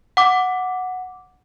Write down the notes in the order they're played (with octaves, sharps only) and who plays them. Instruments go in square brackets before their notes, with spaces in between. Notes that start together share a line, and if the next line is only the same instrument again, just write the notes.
[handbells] F#5 D6